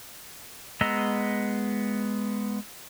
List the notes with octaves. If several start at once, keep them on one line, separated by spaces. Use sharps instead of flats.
G#3 B3 D#5 A#5 E6